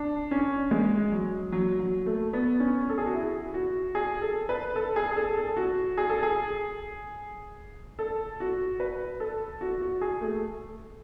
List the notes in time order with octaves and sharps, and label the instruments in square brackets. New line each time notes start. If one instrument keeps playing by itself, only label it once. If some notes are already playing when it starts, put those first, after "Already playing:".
Already playing: [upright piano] D4
C#4
G#3
F#3
F#3
F#3
A3
B3
C#4
A4
G#4
F#4
E4
F#4
G#4
A4
B4
A4
G#4
G#4
A4
A4
F#4
G#4
A4
G#4
A4
F#4
B4
A4
F#4
F#4
G#4
A3